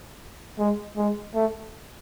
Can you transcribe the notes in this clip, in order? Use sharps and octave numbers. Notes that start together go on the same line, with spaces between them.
G#3
G#3
A3